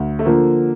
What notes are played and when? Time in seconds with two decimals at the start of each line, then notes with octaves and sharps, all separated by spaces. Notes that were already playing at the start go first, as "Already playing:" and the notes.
Already playing: D2
0.19 A3
0.26 D3 F3 A#3